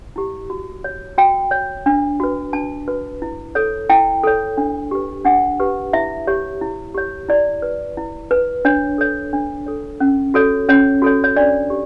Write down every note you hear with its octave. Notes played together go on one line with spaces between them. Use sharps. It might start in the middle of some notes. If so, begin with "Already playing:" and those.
E4 G4
F#4
C#5
F#4 G5
C#5
D4
F#4 B4
D4 A5
F#4 B4
E4
A4 C#5
E4 G5
A4 C#5
D4
G4 B4
D4 F#5
G4 B4
E4 E5
G4 C#5
E4
G4 C#5
E4 D5
B4
E4
B4
D4 C#5
A4 C#5
D4
A4 C#5
C#4
F#4 A4 C#5
C#4 C#5
F#4 A4 C#5
C#5
D4 D5
G4